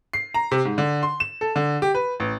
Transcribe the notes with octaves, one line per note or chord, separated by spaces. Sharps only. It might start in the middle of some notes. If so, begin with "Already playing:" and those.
C7
A#5
C3
G#2
D3
C6
E7
A4
D3
G4
B4
A1